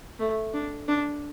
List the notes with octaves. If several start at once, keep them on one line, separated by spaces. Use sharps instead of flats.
A3
D4
D4